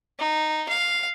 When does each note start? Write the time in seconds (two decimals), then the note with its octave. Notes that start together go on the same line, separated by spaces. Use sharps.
0.19 D#4
0.69 F5